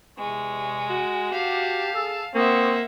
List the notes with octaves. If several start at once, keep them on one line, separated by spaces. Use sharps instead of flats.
E2 C3 G#3 C#6
F#4
G4 F5 A5
G#4 A4 E6
A#3 C4 F4 E5 F#5 C#6 D#6